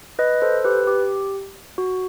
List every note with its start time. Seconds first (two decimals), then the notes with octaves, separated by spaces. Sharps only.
0.19 B4 D#5
0.42 A4 C5
0.64 G4 B4
0.87 G4
1.78 F#4